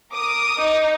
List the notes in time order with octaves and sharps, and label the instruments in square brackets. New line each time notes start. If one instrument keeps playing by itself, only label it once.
[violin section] A#4 D6 D#6
[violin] D#4